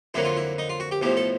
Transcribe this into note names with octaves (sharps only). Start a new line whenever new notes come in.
F2 D3 F#3 A#3 E4
F4
E4
D#4
F4
F#4
G4
B1 A2 F3 G4
A4